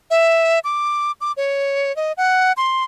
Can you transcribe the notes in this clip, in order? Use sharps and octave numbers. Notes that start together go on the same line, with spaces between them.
E5
D6
D6
C#5
D#5
F#5
C6